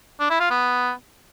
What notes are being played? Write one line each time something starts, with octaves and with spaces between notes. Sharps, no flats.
D4
E4
F4
B3